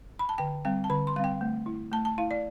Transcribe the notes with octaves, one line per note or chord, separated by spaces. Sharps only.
B5
A5
D3 G5
G3 C4 G5
A5
D3 B5
C6
G3 C4 F5 G5
A3
E4
A3 A5
A5
E4 F5
D5